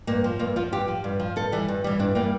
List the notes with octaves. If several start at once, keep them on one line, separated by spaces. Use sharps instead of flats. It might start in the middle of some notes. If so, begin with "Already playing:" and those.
G2 A#3
F3
G2 A#3
F3 F4
G2 G4
F3
G2
F3
G2 A4
E3 G3
G2
E3 G3
G2 D4
E3 G3 A#3